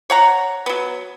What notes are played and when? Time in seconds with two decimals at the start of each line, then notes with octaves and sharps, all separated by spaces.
0.10 C#5 F#5 A#5
0.66 F#3 B3